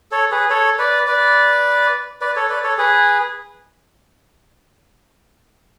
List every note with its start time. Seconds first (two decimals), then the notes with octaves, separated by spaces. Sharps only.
0.11 A4 C#5
0.31 G#4 B4
0.50 A4 C#5
0.79 B4 D5
1.07 B4 D5
2.21 B4 D5
2.35 A4 C#5
2.49 B4 D5
2.63 A4 C#5
2.78 G#4 B4